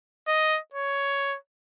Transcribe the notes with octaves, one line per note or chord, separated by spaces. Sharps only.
D#5
C#5